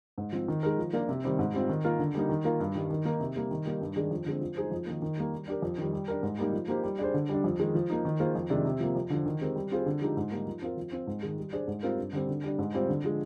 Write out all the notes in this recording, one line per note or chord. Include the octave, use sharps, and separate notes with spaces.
G#2
F3 C4
D#3
G#3 D#4 A#4
F3
A#3 D4 F4 A#4
C3
D#3 G3 C4
G#2
G3 C4 F4
D#3
A#3 F4 A#4
D3
G3 A#3 D#4
D#3
A#3 F4 A#4
G2
D#3 G3
D#3
A#3 D#4 A#4
C3
G3 A#3
D#3
G3 A#3 D#4
G2
D#3 G#3 D4 G#4
F2
D3 G#3 C4
F3
G#3 D#4 G#4 C5
F2
D#3 A#3
D#3
G3 A#3
G3
D4 G4 A#4
F2
D#3 G3
G3
D4 G4 A#4
G#2
G3 A#3 D#4
F3
A#3 D#4 G4 C5
G3
D4 G#4 C5
D3
G3 D4
F2
D#3 G#3
F3
A#3 D#4
D#3
A#3 F4 G#4 C5
F2
C3 D#3 G#3 D4
C3
F3 A#3
F2
D3 F3
D#3
G#3 C4 G4 A#4
G3
C4 F4 G#4 C5
D3
F3 G#3 D#4 G4
G#2
G3 A#3 D#4 A#4
F3
C4 F4 A#4
F3
C4 F4
G#2
D#3 G#3
G3
D4 G#4 C5
G#2
G3 C4 F4 A#4
G2
D3 G3 C4
D3
G3 D4
G#2
G3 C4 F4 C5
D3
F3 G#3